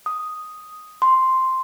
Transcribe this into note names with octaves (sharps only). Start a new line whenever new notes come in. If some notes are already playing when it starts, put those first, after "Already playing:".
D#6
C6